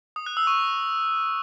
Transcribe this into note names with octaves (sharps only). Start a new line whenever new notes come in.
D#6
F#6
E6
C#6